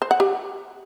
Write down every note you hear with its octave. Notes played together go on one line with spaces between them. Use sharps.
C5
F#5
G4